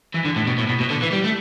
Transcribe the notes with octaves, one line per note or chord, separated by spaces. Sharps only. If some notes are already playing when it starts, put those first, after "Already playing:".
E3
D3
A2
B2
A2
B2
B2
D3
E3
G3
A3